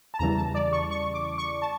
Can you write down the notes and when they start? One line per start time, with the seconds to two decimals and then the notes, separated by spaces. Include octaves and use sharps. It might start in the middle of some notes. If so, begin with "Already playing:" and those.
0.14 A5
0.19 E2 C#3 E3 G3 A#5
0.37 A5
0.55 D5
0.73 C#6
0.91 C#6
1.14 D6
1.38 C#6
1.62 A5